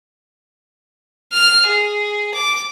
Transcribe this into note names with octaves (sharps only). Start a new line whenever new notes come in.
F6
G#4
D6